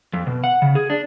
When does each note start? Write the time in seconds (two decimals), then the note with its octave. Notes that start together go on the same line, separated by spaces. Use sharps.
0.13 F2
0.27 B2
0.44 F#5
0.62 C#3
0.75 G#4
0.90 D4